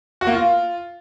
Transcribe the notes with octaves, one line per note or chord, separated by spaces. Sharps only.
F#4
A#3
F4